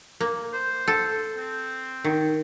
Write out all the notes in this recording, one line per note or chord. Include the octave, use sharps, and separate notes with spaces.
A#3
C5
A4
C4
D#3